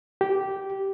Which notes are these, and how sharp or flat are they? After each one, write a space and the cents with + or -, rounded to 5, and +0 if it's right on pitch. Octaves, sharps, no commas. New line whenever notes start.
G4 -10